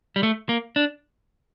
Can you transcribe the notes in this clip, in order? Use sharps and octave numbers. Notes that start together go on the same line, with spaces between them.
G3
A3
A#3
D4